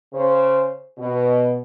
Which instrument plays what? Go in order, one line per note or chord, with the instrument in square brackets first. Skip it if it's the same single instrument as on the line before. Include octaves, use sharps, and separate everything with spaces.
[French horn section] C#3 C5
B2